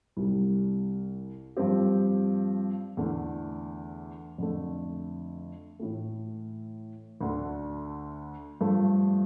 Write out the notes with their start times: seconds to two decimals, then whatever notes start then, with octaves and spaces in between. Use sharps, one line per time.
0.17 C2 C3 G3
1.57 G2 F3 C4 G4
2.97 E2 D3 A3
4.38 F2 D3 A3
5.79 A2 E3 A3
7.21 D2 D3 A3
8.61 G2 F3 A3